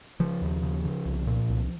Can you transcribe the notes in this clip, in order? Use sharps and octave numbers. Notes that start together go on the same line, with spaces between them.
C#3 F3
D#2
C#3
C#3
C2
A#2
C2